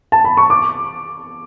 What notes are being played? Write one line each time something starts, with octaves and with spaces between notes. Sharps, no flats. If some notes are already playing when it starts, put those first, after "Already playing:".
A5
B5
C#6
D6